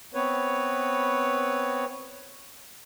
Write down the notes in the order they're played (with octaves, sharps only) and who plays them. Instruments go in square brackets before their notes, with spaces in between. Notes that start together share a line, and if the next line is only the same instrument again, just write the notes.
[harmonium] B3 C4 B4 C#5